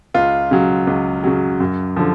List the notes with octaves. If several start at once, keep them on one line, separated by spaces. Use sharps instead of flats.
C#2 F4
C#3 F#3
C#2
C#3 F#3
F#2
D3 F3